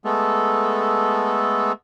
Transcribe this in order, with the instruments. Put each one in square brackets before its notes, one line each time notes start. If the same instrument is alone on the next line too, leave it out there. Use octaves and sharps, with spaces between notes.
[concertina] G#3 A3 B3 A4